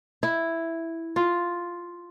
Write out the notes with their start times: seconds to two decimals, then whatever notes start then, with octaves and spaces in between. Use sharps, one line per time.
0.23 E4
1.16 F4